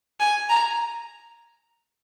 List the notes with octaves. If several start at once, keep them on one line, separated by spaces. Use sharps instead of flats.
G#5
A#5